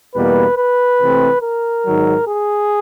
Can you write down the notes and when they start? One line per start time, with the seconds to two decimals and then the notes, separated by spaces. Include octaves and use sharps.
0.15 E2 B2 G3 A#3 B4
0.57 B4
1.00 C3 E3 A3 C4
1.42 A#4
1.86 G#2 D#3 F#3
2.27 G#4